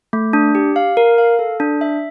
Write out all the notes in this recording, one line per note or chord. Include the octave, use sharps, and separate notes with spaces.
A3
D4
G4
F5
A#4
F5
A4
D4
E5